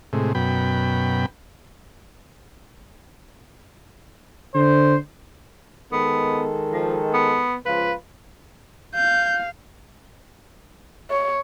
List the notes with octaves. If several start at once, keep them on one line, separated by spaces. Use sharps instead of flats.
A2 C3 G#3
F#2 B2 G5 B5
D3 C5
D#3 G#3 B3 A4
F3
B3
C#2 F3 F4 B4
F5 G6
C#5